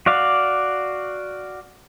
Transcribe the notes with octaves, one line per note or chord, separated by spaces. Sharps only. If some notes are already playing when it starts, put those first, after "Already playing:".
F#4 D5 F5